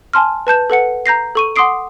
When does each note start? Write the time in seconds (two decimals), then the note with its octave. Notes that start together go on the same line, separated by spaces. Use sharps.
0.13 G#5 A5 C6 F6
0.47 B4 A5 G6 E7
0.70 A4 B4 F#5 C#7
1.06 A#5 G6 A#6 C7
1.35 A4 C#6 D#7
1.56 F#5 C6 D6 D#6 C7 D7